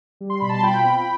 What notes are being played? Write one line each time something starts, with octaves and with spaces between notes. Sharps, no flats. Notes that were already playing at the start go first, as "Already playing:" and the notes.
G3
C6
B2 B5
A5 C6
F4 G5 B5
C4